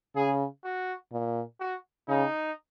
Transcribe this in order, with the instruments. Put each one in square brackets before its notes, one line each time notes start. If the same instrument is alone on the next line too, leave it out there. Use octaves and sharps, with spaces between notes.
[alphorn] C#3 [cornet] G#4
[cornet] F#4
[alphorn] A#2
[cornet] F#4
[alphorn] C#3 [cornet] D#4